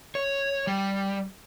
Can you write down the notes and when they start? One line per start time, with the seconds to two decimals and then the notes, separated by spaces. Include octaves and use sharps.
0.15 C#5
0.67 G3